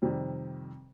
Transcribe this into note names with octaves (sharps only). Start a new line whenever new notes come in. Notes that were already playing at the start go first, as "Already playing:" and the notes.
F2 C3 D#3 G3